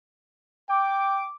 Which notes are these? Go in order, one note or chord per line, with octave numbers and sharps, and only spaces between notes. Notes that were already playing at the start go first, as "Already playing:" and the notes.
G5 D6